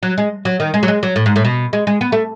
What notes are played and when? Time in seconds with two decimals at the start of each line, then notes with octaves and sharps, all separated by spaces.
0.03 F#3
0.18 G#3
0.45 F#3
0.60 D#3
0.74 G#3
0.83 F#3
0.88 G#3
1.03 F#3
1.16 A2
1.26 G#2
1.36 A2
1.45 B2
1.73 G#3
1.87 G#3
2.01 B3
2.12 A3